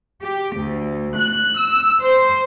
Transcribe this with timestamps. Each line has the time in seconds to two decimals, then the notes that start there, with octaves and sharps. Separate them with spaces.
0.22 G4
0.56 D2
1.16 F#6
1.59 E6
2.03 C5